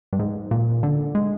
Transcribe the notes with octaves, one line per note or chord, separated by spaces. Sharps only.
G2
G#2
A#2
D3
G#3